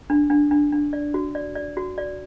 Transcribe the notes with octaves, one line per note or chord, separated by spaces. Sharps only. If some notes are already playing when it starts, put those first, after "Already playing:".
D4
D4
D4
D4
D5
F#4
D5
D5
F#4
D5